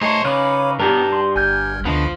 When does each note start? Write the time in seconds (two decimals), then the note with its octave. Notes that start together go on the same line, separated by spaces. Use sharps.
0.01 A3 D#4 G#4 C5 C#5 D#5 A5
0.25 C#3 D#4 B4 C#5 F5 B5 D6
0.80 G2 B3 F#4 G4 A#4 A5
1.12 C6
1.36 G1 G#5 F6 G6 G#6
1.85 D2 D3 F3 B3 D4 D#5